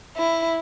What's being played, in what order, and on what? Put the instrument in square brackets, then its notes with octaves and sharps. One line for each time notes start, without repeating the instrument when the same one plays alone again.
[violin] E4